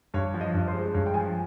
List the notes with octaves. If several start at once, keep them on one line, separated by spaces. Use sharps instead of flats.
G2 C#5
F3
D#5
G2
C5
G#3
G2 C#5
G5
F3 G#5